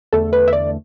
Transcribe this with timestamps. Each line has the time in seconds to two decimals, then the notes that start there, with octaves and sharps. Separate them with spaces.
0.13 E2 D3 A3 A4
0.33 B4
0.48 E5
0.53 D5